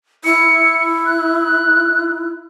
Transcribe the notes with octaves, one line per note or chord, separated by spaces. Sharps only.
E4 C#7
F#6